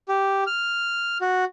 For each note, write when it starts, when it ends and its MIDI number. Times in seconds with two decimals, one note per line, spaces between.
0.09 0.44 67
0.47 1.18 89
1.21 1.45 66